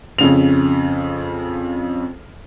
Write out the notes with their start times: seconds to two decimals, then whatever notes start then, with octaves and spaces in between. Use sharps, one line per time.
0.18 F2 C#3 F7